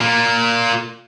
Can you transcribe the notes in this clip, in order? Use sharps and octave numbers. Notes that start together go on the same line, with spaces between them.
A#2 A#3